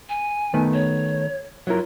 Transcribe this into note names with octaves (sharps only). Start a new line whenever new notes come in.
G#5
D#3 A3 B3
C#5
F#3 E4 F4 A#4